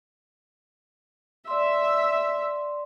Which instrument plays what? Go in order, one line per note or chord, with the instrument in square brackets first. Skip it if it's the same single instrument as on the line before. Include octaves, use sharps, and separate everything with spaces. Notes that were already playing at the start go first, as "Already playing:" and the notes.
[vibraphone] D5 C6 [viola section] E5